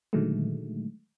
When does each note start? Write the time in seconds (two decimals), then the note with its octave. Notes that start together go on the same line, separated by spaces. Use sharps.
0.13 A#2 D3 D#3 F#3 G#3 A3